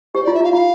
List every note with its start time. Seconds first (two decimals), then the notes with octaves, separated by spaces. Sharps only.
0.15 G4 C5
0.24 D5
0.27 F4
0.35 E5
0.41 F4 F5
0.53 F4 F5